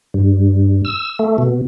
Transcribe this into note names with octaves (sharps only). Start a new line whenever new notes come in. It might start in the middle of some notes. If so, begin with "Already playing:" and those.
G2
E6
A3
B2